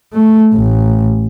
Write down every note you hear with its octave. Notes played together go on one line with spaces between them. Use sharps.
A3
A1